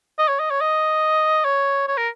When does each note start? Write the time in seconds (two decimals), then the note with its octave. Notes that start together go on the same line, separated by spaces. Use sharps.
0.19 D#5
0.28 C#5
0.40 D#5
0.51 C#5
0.61 D#5
1.45 C#5
1.88 C#5
1.97 A#4